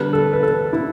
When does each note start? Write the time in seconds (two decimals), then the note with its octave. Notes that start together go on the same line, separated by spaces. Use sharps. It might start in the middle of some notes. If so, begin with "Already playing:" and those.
Already playing: D3 G3 B3 B4
0.13 A4
0.33 B4
0.43 A4
0.73 E4